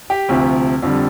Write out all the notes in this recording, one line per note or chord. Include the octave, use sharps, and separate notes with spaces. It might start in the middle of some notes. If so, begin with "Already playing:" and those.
G4
D2 C3 F3
F2 D3 G3